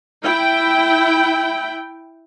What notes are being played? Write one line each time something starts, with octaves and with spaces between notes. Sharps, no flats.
E4 G5